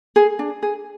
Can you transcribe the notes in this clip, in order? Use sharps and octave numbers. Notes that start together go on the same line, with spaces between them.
G#4
D4
G#4